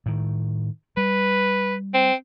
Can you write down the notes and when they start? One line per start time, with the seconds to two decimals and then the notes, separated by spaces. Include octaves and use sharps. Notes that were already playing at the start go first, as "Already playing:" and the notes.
0.06 A2 D#3
0.97 G3 B4
1.94 C4